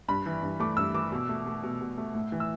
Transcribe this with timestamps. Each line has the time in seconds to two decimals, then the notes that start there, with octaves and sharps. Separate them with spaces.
0.08 G2 B5
0.26 E3
0.43 G2
0.60 A3 D6
0.77 G2 E6
0.94 E3 D6
1.12 B2
1.29 A3
1.46 A3
1.63 B2
1.81 B2
1.98 A3
2.15 A2
2.32 E3
2.40 E6